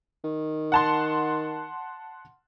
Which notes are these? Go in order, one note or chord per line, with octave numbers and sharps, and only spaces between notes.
D#3
F#5 A5 C6